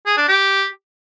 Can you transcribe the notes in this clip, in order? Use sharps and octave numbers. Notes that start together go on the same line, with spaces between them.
G#4
D4
G4